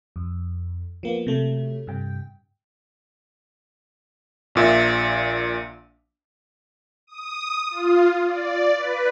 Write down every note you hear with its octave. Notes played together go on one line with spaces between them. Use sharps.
F2
F3 A#3 B3
C3 F#3 A3
G2 C3 G5
A#1 A#2 E5
D#6
F4
D5
B4